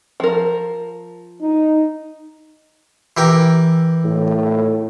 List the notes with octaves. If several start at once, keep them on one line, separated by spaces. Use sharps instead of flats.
F3 A#4
D#4
E3 G4 A#4
A2